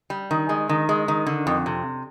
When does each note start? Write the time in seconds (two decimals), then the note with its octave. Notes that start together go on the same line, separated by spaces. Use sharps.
0.10 G3
0.31 D#3
0.49 G#3
0.69 D#3
0.89 G#3
1.08 D#3
1.27 D3
1.47 F2
1.66 C3